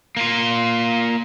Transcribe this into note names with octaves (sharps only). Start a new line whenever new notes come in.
A#3 F4